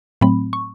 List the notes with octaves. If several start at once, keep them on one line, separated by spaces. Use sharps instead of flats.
A2 F#3 A3 C4 B5
C#6